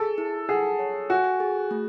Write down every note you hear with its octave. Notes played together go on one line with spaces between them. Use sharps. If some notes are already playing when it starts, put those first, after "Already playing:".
Already playing: G#4 A4
E4
G#4 F#5
C#5
F#4 G#5
G#4
A3